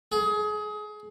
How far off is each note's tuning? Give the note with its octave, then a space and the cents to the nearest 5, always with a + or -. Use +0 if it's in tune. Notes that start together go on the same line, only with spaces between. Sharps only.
G#4 +25